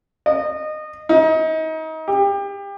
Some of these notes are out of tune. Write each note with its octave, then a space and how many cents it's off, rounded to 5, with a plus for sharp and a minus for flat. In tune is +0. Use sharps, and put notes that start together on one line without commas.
D#5 -20
D#4 +30
G4 +30